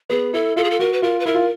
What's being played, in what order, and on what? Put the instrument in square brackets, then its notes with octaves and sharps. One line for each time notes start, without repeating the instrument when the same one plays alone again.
[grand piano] B3 [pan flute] G#4
[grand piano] E4 [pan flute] A4
[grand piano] F4 [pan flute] A4
[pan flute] G#4
A4
[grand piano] F#4 [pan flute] A#4
[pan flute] B4
[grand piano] F4 [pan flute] A#4
[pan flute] B4
[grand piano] E4 [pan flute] A#4
[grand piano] F4